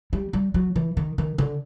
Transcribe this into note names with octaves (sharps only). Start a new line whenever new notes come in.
G3
G3
F#3
E3
D#3
D#3
D3